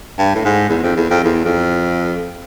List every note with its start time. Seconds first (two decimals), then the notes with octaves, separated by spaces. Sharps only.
0.18 G2
0.35 A2
0.44 G#2
0.69 E2
0.83 F2
0.96 E2
1.10 F2
1.24 E2
1.45 F2